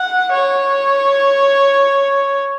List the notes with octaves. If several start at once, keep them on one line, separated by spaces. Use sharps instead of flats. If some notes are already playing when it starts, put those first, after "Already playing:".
Already playing: F#5
C#5